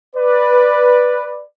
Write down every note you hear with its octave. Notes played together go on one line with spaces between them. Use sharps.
B4 D5